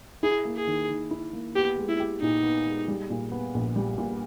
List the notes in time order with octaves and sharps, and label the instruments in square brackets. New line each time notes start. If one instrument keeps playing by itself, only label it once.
[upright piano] E4 [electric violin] G#4
[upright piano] A#3
[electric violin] G#4
[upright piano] D#3
D#3
E4
A#3
[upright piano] B3 [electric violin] G4
[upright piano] G#3
[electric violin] E4
[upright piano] G4
[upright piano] A#2 [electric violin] D#4
[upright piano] B3
G#3
G3
A#2
B3
A#1
G3
A#2